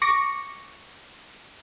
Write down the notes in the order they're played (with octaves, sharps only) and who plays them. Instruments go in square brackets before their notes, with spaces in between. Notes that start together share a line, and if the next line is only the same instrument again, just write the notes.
[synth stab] C#6 D6 A#6 C#7